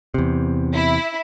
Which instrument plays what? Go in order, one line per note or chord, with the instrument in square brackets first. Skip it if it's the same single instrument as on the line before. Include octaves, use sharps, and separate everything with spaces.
[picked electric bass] E2 C3
[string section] E4